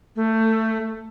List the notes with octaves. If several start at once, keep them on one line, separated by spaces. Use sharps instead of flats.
A3